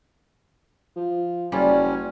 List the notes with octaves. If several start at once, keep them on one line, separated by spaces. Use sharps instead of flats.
F3
F#1 G3 C#4 F4